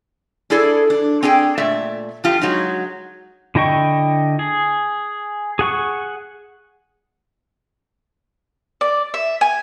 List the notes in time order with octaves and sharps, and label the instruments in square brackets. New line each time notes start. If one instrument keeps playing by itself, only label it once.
[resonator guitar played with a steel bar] D4 E4 G#4 A4 D5
D4
C4 D4 G#4 G5
A#2 A3 D5 E5
F3 F4 G4
F#3 G#3 D#4
[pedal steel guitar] D3 E4 D#5 G5 C#6
G#4
G#4 F#5 C#6
[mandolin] D5
E5
G#5